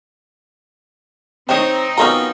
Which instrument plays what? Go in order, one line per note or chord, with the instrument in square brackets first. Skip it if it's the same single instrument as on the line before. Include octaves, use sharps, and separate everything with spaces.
[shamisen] D#3 G4 [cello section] C4 D#4 [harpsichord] C5 C#5 D#6
[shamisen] F#3 A#4 A#5 [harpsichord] B3 C#4 F4